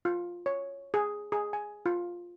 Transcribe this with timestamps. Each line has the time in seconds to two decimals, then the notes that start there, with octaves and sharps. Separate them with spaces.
0.05 F4
0.46 C#5
0.94 G#4
1.32 G#4
1.53 G#5
1.86 F4